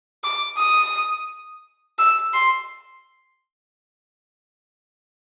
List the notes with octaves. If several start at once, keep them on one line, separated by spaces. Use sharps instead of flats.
D6
D#6
E6
C6